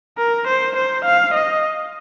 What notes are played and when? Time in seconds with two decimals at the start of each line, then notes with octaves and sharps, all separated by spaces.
0.18 A#4
0.47 C5
0.76 C5
1.05 F5
1.34 D#5